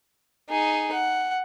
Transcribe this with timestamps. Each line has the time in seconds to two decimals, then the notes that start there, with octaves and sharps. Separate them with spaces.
0.49 D#4 G#4
0.92 F#5